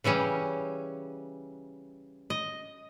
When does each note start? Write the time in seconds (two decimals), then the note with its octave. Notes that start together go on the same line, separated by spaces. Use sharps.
0.04 C#3 E3 G3 C#4
2.30 D#5